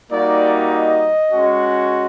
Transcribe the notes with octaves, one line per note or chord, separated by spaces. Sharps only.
G3 A#3 D#4 F#4 D5
D#5
G#3 C#4 F#4